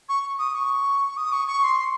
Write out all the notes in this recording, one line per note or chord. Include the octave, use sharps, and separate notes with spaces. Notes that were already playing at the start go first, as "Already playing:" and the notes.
C#6
D#6
C#6
D#6
C#6
C#6
C6
C6